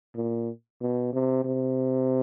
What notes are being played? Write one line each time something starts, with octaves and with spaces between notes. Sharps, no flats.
A#2
B2
C3
C3